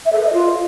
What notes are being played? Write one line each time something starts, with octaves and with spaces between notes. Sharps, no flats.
E5
A4
B4
D#5
F4